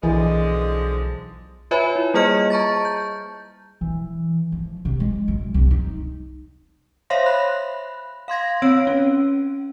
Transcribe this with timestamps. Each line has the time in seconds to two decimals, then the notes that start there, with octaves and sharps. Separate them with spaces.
0.03 B1 D3 E3 F3 G#3
1.71 F4 B4 C#5 E5 G#5 B5
1.96 E4
2.14 G3 A#3 G#4 D#5 F6 C#7
2.50 A5 A#5 C#6 A6
2.85 G6
3.81 E3
4.52 F3
4.85 C3
5.00 G#3
5.28 F#2
5.54 C2
5.71 D#4
7.10 C5 C#5 E5 F5 C6 A#6
7.26 B5 F#6
8.28 F5 C6 G#6 A#6
8.62 C4 C#5 F5 E6 D7
8.87 C#4